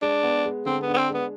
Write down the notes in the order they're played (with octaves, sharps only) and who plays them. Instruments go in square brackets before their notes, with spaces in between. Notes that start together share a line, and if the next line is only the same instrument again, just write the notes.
[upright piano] G#3 [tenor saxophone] D4
[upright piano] B3
G#3
[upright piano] D3 [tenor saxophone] C4
[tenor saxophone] B3
[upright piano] D4
[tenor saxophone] B3
C4
[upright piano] G#3
[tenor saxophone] B3